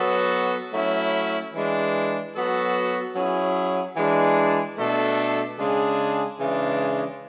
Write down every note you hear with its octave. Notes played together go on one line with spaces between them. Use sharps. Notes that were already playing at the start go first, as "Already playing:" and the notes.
Already playing: F#3 B3 F#4 A4
F#3 A3 C#4 E4
E3 G#3 D4
F#3 B3 F#4 A4
F#3 C#4 E4 G#4
E3 G#3 D4
B2 A3 D4 A4
C#3 G#3 D4 G#4
C#3 E3 G#3 D4